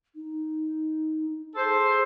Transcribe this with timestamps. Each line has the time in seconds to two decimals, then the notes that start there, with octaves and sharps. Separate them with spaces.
0.15 D#4
1.55 G#4 A4 C5